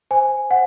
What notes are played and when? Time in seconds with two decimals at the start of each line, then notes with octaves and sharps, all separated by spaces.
0.11 C5 G#5
0.51 C5 F#5